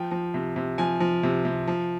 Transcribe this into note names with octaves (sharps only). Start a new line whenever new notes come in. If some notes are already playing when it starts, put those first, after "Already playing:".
Already playing: F3 G5
F3
C3
C3
F3 G#5
F3
C3
C3
F3